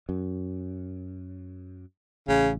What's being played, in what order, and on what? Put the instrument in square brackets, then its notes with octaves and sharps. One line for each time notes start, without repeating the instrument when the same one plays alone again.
[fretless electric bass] F#2
[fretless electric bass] A1 [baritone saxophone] C#3